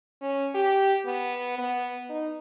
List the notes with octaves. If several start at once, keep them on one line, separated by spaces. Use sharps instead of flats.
C#4
G4
B3
B3
D#4